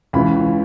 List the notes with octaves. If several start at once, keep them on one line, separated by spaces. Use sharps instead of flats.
C#2 C#3 E3 B5